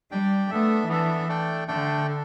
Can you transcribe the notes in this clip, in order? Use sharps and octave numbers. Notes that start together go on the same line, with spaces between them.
G3 D4 G4 D5 G5
A3 B3 D4 A4 E5
E3 B3 D4 A4 E5
A3 D4 A4 D5 G5
D3 A3 D4 A4 D5 G5
D4 A4